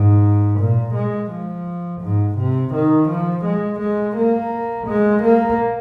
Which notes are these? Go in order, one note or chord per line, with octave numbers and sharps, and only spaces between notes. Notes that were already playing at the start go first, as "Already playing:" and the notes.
Already playing: G#2
A#2
G#3
F3
G#2
C3
D#3
F3
G#3
G#3
A#3
G#3
A#3